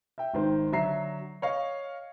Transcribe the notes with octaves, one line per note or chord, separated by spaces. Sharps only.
E5 G5
G#1 D#3 C5
D3 F#3 E5 A#5 C7
C#5 D#5 F5